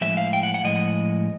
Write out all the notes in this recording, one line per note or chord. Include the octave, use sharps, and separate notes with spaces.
A2 F3 G#3 E5
F5
G5
F#5
F#5
A2 F3 G#3 D#5